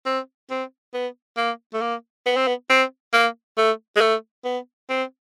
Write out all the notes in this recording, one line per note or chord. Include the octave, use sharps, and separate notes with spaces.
C4
C4
B3
A#3
A3
A#3
B3
C4
B3
C4
A#3
A3
G#3
A3
B3
C4